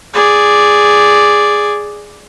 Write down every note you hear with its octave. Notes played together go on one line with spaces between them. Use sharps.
G#4 D5